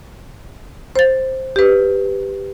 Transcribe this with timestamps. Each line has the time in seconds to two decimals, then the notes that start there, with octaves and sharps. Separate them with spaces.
0.96 C5 A6
1.56 G4 B4